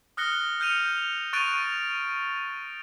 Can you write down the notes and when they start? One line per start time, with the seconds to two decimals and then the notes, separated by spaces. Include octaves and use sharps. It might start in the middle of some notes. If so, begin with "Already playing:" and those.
0.17 D#6 F6 F#6 A#6 C#7 G7
0.60 F6 G6 C#7 D#7 F7
1.33 C#6 F#6 A6 D7 D#7 F7